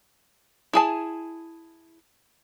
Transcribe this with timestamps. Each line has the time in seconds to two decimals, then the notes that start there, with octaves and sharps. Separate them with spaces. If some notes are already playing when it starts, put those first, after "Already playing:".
0.73 E4 G#4 A5